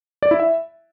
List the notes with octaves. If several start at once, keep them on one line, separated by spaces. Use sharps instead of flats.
D5
E4
E5